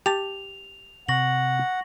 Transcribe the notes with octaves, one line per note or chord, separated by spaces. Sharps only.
G4 A5 F7
C3 F#5 C#6 A#6 F#7